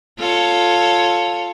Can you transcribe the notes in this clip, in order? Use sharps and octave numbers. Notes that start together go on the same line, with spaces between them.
F4 A4 C#5